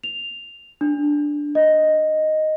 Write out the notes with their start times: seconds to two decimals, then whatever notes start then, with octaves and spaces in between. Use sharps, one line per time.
0.03 F7
0.81 D4
1.55 D#5